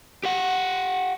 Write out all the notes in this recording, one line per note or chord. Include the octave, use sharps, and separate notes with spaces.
G4 F#5